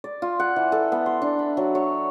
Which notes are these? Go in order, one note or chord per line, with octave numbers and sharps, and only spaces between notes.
D5
F4
F#5
E3
A4
B3
C6
D4
B5
F#3
C#5